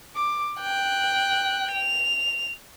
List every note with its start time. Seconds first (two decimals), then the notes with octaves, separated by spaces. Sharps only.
0.16 D6
0.60 G5 F#6
1.72 F7